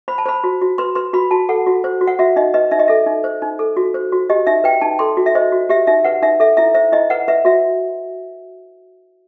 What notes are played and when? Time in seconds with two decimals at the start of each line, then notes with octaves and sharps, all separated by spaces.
0.08 C5 B5
0.18 A5
0.26 C5 B5
0.44 F#4
0.61 F#4
0.78 B4 C6
0.95 B4 C6
1.13 F#4 B5
1.31 F#4 A5
1.49 A4 F#5
1.67 F#4
1.84 C5
2.01 F#4
2.07 F#5
2.19 F#4 E5
2.36 D#4 D#5
2.54 B4 D#5
2.71 D#4 E5
2.79 D#5
2.88 A4 E5
3.07 D#4
3.24 C5
3.42 D#4
3.59 A4
3.77 F#4
3.94 C5
4.12 F#4
4.30 G4 D#5
4.47 D#4 E5
4.64 B4 G5
4.81 D#4 A5
4.99 A4 C6
5.17 F#4
5.26 E5
5.35 C5 D#5
5.52 F#4
5.69 G4 E5
5.87 D#4 E5
6.04 B4 F#5
6.22 D#4 E5
6.40 A4 E5
6.57 E4 E5
6.74 C5 E5
6.92 E4 D#5
7.10 B4 F#5
7.28 B4 E5
7.45 F#4 E5